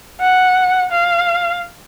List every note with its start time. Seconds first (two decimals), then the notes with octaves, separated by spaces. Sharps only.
0.21 F#5
0.91 F5